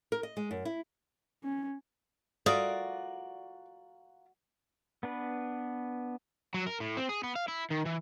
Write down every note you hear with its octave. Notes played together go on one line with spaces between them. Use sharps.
A#4
D#5
G#3
F#2
E4
C#4
F4 F#4 A4 A#4 D5 F5
B3 D4 B4
F#3
A#4
A2
C4
G#4
B3
F5
E4
D#3
E3